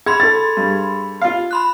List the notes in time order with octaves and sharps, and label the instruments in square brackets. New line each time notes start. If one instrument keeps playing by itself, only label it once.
[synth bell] G#4 B5 C6 [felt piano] G#6
[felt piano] A4 A6
[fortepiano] G2
F4 F5
[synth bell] B5 C6 F#6